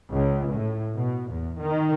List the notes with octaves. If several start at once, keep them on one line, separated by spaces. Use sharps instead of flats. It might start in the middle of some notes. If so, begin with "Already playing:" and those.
C#2
A2
B2
E2
D#3